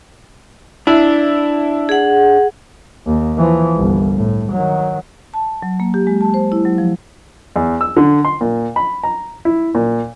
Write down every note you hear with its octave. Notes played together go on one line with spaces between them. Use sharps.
D4 E4
G#4 F#5
D#2
E3 F3
G1 C2
A2
D#3 F#3
A5
F#3
A#3
G4
G#3
A5
C5
E4
F#3
F3
E2
E6
D3
C6
A#2
B5
A#5
E4
A#2